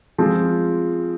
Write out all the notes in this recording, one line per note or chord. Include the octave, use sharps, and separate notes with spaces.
F3 G#3 C4 F4